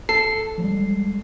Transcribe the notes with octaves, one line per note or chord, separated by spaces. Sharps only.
A4 C7
F3 G3 G#3